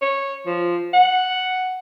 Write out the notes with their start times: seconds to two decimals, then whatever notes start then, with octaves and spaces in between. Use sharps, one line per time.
0.01 C#5
0.46 F3
0.93 F#5